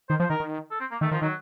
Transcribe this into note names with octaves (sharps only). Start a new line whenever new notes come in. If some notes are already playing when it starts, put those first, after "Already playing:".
D#3 C5
F3 C5
D#3 A#4
D#3
A4
C4
A#3
D#3 A3
D#3 F3
D#3 F#3